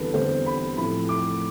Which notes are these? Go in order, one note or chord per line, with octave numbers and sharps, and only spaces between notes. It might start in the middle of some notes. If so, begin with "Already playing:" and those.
Already playing: E2 D3 G3 C4 A4 B4
E2 D3 G3 C4 C5
B5
A2 F3 A3 C4 E4 B5
D6